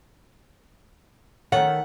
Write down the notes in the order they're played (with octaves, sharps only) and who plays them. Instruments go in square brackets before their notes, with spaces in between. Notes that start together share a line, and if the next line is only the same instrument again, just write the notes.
[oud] D#3 A3 C#5 [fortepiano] F#5